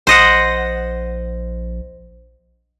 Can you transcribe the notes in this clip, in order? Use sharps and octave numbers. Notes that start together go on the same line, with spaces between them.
A#1 C5 D#5 F#5